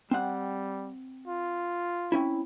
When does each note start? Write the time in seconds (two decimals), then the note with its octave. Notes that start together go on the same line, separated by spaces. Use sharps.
0.11 G3 C4 F#5
1.27 F4
2.12 C4 C#4 E4